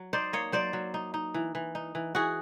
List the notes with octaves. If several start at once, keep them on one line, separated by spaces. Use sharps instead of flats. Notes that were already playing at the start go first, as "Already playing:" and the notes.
Already playing: F#3
D#4 C5 D5
A#3 C#5 D#5
F#3 C5 D5
F#3
D#4
D#4
E3
E3
D#4
E3
E3 F#4 G#4